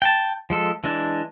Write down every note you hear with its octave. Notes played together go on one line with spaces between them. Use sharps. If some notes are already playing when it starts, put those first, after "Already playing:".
G5 A5
F3 G#3 A4
E3 G#3 D4